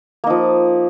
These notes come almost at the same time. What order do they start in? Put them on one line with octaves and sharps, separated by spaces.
A#3 D#4 F3